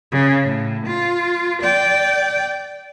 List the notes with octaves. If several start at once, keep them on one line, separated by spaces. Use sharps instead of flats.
C#3
A2
F4
D5 G5